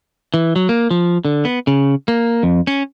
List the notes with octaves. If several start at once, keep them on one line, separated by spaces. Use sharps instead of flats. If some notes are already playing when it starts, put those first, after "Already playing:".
E3
F#3
A#3
F3
D3
B3
C#3
A#3
F2
C#4